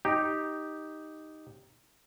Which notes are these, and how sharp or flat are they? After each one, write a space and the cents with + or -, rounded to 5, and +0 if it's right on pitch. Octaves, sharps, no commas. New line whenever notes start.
D#4 +0 G4 +0